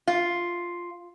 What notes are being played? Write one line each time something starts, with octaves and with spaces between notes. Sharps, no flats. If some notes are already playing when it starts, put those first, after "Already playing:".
F4